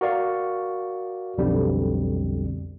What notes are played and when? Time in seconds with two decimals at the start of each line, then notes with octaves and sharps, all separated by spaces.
0.01 F#4 A#4 D5 F5 C#6
1.38 B1 F2 D3 G3